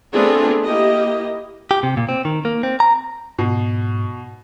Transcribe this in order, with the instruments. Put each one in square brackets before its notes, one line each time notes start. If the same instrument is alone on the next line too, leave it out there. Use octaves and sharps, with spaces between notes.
[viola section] A3 B3 C4 D4 F4 G#4
A#3 E4 G4 D#5
[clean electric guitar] G4
C3
A#2
C4
D#3
A#3
C4
A#5
[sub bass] G#2 [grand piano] B2